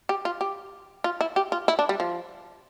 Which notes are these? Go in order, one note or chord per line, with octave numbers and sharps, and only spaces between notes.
G4
F4
G4
F4
E4
G4
F4
E4
D4
G3
F3